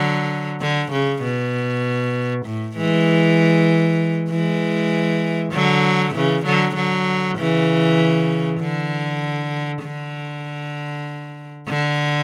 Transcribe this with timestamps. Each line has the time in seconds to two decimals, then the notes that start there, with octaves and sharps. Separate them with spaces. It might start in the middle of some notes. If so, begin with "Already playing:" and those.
Already playing: D3 F#3
0.61 D3
0.92 C#3
1.23 B2
2.46 A2
2.76 E3 G#3
4.30 E3 G#3
5.53 D3 F#3
6.14 C#3 E3
6.45 D3 F#3
6.75 D3 F#3
7.38 C#3 E3
8.60 D3
9.83 D3
11.68 D3